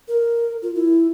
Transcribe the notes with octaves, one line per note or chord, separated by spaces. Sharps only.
A#4
F4
E4